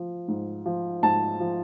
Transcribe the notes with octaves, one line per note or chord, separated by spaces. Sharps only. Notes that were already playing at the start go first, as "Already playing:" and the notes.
Already playing: F3
G#2
F3
G#2 A5
F3